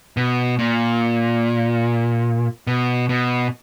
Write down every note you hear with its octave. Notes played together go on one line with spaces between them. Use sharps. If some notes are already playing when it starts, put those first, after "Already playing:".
B2
A#2
B2
B2